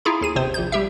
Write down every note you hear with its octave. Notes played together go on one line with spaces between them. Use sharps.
E4 F4 G#4 A#5
D#2 G#4 D#7
G1 C3 C5
A#1 G6
G3 G4 E5